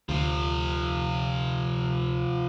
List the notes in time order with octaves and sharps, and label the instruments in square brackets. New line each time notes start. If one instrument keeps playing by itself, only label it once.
[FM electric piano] D2 [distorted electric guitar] C3 F3